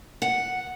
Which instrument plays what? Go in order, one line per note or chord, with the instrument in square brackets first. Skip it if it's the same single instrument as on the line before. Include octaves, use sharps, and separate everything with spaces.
[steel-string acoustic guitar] F#5